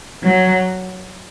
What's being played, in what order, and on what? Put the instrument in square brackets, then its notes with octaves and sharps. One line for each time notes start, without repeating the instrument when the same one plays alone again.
[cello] F#3